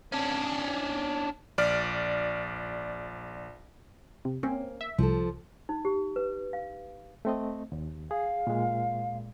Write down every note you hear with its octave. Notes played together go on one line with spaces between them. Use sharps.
C#4 D4
A#1 D5 F6
C3
A#3 C4 C#4
E5
C2 F3 A4
D#4
G4
B4
F5
A3 C4 D#5
D#2
G#4 F5
A#2 G#3